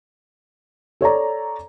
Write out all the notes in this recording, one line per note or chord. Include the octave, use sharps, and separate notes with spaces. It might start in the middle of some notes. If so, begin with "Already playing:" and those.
A4 C#5 D5 A#5